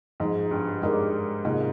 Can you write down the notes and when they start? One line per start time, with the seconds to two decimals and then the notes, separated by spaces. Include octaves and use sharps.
0.20 G#2 F3 G#3 D#4
0.51 G2
0.82 G#2 G#3 D#4 G4 A#4 D5
1.45 G#2 C3 D#3 A#3 F4